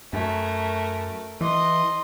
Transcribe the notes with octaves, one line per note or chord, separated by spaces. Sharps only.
F#2 A3 A#4
E3 D#5 C6